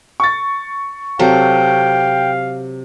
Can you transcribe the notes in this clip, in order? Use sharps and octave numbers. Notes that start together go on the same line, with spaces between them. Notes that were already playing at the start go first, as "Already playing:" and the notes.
C#6 A6
C3 F#3 A4 F5 G5